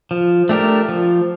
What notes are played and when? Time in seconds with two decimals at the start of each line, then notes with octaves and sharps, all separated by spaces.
0.11 F3
0.49 A3 D4 G4 A#4
0.89 F3